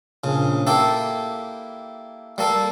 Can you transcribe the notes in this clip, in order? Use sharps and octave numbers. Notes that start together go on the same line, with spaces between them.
A#1 C#3
A#3 E4 G4 A4
G3 A#3 A4